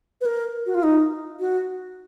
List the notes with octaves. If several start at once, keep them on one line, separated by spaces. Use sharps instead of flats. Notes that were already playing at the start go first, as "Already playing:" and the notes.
B4
A#4
F#4
F4
D#4
F#4